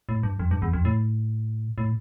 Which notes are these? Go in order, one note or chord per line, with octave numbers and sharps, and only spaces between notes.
A2
G2
F2
G2
E2
F2
A2
A2